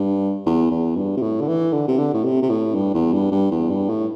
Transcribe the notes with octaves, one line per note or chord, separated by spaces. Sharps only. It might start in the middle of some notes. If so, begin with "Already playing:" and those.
Already playing: G2
E2
E2
G2
C3
A2
D3
E3
D3
C3
D3
A2
C3
C3
A2
G2
E2
G2
G2
E2
G2
A2